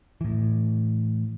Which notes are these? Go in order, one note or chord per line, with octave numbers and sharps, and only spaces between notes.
A2 E3